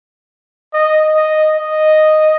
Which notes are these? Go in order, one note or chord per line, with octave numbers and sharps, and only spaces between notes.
D#5
D#5
D#5